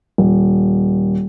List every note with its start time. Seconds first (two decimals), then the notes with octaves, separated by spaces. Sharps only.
0.18 D#1